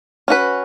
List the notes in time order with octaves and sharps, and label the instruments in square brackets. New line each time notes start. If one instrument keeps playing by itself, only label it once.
[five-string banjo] C#4 F#4 B4